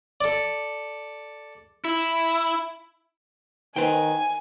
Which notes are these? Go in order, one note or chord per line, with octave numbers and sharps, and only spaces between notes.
A4 D5
E4
D#3 B4 C5 G5 G#5